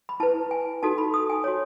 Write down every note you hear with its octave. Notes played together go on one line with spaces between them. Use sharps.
B5
E4 B4 A5
G#5
D#4 F#4 A4 A5
B5
D#6
G#5
F#4 C#5